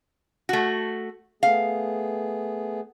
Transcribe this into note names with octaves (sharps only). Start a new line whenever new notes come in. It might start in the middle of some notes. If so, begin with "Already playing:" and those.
A3 F#4
A3 B3 G#4 F5